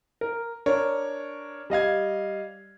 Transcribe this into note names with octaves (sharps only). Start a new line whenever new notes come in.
A#4
D4 A#4 C#5
G3 D#5 F5 G#6